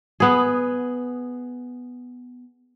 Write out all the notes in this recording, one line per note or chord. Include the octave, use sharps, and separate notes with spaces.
B3 G#4